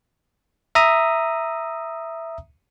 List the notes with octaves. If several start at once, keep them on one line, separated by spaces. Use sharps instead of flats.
E5 A#5 D#6